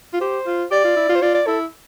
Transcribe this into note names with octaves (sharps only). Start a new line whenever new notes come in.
F4
G4 C5
F4
G4 D5
F4
E4
F4
C5
F4 D5
D5
E4 A4